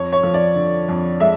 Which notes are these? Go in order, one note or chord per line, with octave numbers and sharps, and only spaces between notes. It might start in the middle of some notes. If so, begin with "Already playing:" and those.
Already playing: F2 C#5
C#5
F3
D5
D3
F2
G#3 E5